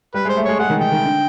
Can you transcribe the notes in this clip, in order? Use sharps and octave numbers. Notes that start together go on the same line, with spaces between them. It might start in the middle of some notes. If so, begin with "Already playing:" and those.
G3 B4
G#3
C5
A3
G#3 C#5
G#3 F#5
D#3
D#3 G5
D#3
D3